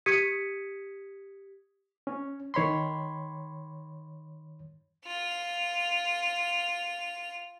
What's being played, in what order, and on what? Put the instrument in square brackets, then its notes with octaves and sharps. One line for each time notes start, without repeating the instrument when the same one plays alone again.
[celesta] G4 D#6 G#6 B6 C#7 D#7
[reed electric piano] C#4
D#3 C#5 B5 C6
[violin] F4 F7